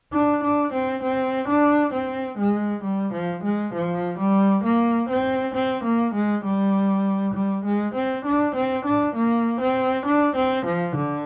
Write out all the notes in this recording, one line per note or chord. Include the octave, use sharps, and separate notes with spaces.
D4
D4
C4
C4
D4
C4
G#3
G3
F3
G#3
F3
G3
A#3
C4
C4
A#3
G#3
G3
G3
G#3
C4
D4
C4
D4
A#3
C4
D4
C4
F3
D3